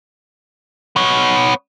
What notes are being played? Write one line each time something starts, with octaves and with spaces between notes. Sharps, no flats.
B3 C#5